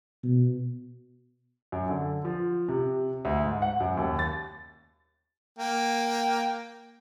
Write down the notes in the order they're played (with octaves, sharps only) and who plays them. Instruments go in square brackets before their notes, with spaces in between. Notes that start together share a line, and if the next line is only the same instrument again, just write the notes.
[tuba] B2
[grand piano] F#2
D3
F3
C3
D2
G#2
F#5
F#2
D#2
A6
[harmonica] A#3 G5